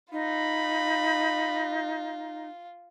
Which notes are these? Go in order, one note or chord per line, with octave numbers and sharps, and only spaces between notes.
D#4 F4 B5